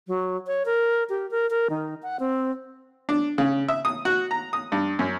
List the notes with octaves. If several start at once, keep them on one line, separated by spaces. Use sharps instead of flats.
F#3
C#5
A#4
G4
A#4
A#4
D#3
F#5
C4
D4
C#3
E5
D#6
F#4
A#5
D#6
G2
F#2